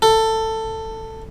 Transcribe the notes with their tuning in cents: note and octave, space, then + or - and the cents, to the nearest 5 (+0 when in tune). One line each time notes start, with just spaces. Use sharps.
A4 +15